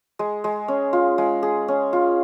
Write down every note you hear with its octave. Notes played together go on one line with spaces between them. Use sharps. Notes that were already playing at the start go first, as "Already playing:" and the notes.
G#3
G#3
C#4
F4
G#3
G#4
C#4
F4